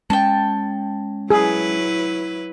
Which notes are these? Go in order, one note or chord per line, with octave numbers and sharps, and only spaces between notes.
G#3 C#4 G5 A5
F#3 E4 G#4 B4